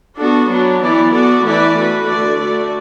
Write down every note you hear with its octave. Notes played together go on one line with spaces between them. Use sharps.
B3 D4 F#4 A4
F#3 B3 D4
E3 B3 E4 D5
B3 F#4 A4 D5
E3 A3 E4 B4 D5
A3 F#4 B4
D3 A3 F#4 D5
A3 F#4 D5